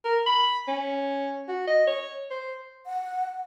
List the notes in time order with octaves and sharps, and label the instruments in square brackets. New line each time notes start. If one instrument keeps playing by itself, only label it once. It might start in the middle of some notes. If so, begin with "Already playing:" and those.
[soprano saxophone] A#4
B5
C#4
F#4
D#5
C#5
C5
[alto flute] F#5